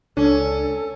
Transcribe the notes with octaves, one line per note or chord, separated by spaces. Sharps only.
C#2 C#4 D4 A4